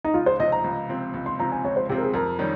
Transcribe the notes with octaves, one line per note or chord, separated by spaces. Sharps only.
D#4
C#2 F4
C5
C3 F3 C4 D#5
A#5
C#2
C3 F3 C4
C#2
C6
C3 F3 C4 A#5
G#5
C#2 C#5
C5
C3 F3 C4 G4
A#4
G#4
F2 A#4
D#3 G3 C#4